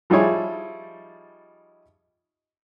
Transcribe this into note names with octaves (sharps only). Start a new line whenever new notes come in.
F3 G3 D#4 E4 G#4 C#5